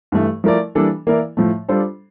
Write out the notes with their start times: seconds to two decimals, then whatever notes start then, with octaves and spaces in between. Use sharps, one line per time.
0.12 G2 E3 A3
0.44 F3 A3 E4 A#4 D5
0.75 E3 G3 A#3 D4 A4
1.07 E3 A#3 E4 A#4 D5
1.37 A2 F3 A3
1.68 G3 D4 F4 A4 C5